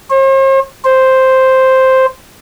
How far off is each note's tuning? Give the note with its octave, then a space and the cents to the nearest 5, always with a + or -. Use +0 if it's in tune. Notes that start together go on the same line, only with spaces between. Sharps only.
C5 +45
C5 +0